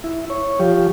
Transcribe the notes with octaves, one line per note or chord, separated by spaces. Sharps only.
E4
C#5
F3 G4